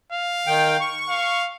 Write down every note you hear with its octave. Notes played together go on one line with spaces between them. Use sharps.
F5
D#3 G5
C#6
F5